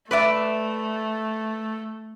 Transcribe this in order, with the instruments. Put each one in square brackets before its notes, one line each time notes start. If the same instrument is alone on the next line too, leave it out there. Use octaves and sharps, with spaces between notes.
[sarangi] A3 [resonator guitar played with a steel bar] B4 D5 E5